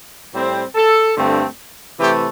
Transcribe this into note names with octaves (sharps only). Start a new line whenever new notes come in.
A2 G3 C4
A4
G2 D3 A3 C4
C3 E3 A3 G4